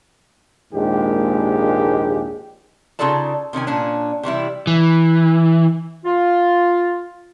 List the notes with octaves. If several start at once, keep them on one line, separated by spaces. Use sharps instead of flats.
A#1 D#2 G#2 G#3 G4
C#3 D#4 F4 A4 D5 A5
C3 D#3 C#4 G#5
A#2 C#4 D4
C3 E3 G3 E4
E3
F4